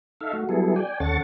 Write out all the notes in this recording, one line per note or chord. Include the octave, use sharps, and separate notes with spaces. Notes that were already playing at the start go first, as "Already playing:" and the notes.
D#4 A4 E5 F5
A3 F#4
F#3 G3 B3 E4 G#4 A4
D5 G5 G#5
D#2 C#4 A4 F#5 C#6 A6